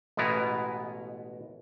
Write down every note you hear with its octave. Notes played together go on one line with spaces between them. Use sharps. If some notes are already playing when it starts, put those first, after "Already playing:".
A1 B2 G#3 B3 E4 A#5